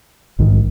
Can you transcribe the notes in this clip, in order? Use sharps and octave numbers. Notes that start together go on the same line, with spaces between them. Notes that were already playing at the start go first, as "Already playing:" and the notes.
A#1 G#2 D#3